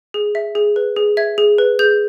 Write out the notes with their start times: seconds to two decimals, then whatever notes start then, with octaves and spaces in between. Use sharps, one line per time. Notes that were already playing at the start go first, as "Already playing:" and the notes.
0.14 G#4
0.35 E5
0.55 G#4
0.76 B4
0.96 G#4
1.17 E5 G#6
1.38 G#4
1.58 B4
1.79 G#4 G6